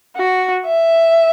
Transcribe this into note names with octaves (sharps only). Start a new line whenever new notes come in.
F#4
E5